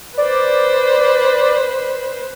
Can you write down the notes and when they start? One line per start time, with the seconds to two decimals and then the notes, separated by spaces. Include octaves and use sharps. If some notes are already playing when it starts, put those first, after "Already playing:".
0.17 B4 C5 D5